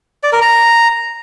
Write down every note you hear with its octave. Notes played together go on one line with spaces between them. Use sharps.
D5
A#4
A#5